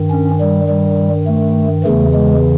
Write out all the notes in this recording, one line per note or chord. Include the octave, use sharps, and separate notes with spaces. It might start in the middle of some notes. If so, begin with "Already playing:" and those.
Already playing: G2 D#3
C#4
G3
G3
A3
E2 C#3 E3 A3
G#3